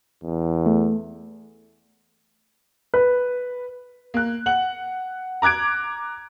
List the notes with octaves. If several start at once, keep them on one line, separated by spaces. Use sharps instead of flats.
E2
A3
B4
A#3 F#6
F#5 F#7
A#5 D6 F#6 G#6 D7